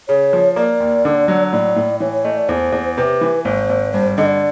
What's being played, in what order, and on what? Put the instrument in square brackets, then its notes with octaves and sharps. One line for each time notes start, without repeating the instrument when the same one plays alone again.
[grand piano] C#3 [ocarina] C#5
[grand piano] F3
[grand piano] A#3 [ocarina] D5
[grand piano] D#2
D3
F#3
[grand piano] A2 [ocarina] D5
[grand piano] A2
[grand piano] E3 [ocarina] C#5
[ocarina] C#5
[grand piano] A3 [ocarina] D#5
[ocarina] D5
[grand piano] E2 [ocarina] C5
[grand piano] E2
[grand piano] C3 [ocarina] B4
[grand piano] E3
[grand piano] G#1 [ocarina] C5
[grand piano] G#1
[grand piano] G2 [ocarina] C5
[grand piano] D3 [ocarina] D#5
[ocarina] D5